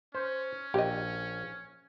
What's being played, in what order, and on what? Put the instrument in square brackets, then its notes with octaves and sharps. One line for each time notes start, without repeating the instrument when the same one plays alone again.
[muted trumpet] C#4 [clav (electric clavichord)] C5
[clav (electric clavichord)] A#1 [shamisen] G4 D#5